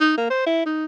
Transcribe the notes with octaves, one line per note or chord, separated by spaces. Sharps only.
D#4
A#3
C5
E4
D#4